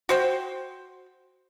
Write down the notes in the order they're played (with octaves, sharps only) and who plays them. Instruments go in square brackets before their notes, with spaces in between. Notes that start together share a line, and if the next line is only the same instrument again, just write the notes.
[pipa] F#4 C5 G5